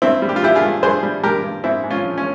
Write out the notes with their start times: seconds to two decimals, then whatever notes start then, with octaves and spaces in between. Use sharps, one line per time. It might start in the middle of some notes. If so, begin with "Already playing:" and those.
0.02 G2 C4 E4
0.22 G3
0.29 G4
0.36 F4
0.43 G3 E4 G4
0.55 F4 G#4
0.63 G2
0.83 G2 G#4 C5
1.03 G3
1.23 G3 G4 A#4
1.44 G2
1.64 G#2 C4 E4
1.84 G#2
1.91 C#4 F4
2.04 F3
2.18 C#4